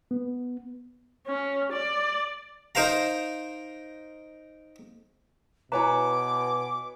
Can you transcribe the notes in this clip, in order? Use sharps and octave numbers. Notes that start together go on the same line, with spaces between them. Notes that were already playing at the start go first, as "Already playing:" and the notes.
B3
C#4
D5
D#4 A#4 C5 F5 A#5
B2 E4 B4 C#5 G#5 A#5 D6